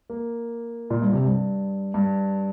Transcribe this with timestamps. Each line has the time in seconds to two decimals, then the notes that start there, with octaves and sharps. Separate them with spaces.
0.10 A#3
0.90 A#2
1.02 G2
1.13 C3
1.25 G2
1.94 G2